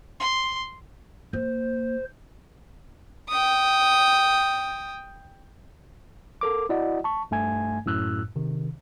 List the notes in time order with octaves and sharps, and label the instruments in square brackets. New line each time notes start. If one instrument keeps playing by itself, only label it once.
[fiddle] C6
[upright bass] A#3 [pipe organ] C5
[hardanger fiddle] G5 D#6
[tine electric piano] A4 A#4 D6
E4 F#4 D5 D#5 F#5
A5 C#6
G2 A3 G#5 G#6
F#2 A2 E6 F#6
C3 D#3